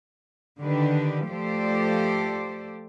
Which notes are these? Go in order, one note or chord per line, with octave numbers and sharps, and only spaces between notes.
D3 D#3 D4 G4 B4
F3 A3 G4 A4 C5 D5